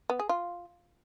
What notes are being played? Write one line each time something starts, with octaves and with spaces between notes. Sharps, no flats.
B3
G#4
F4